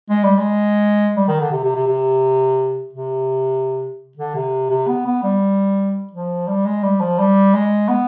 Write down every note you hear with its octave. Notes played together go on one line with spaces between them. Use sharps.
G#3
G3
G#3
G3
D#3
D3
C3
C3
C3
C3
C3
D3
C3
C3
B3
B3
G3
F3
G3
G#3
G3
F3
G3
G#3
B3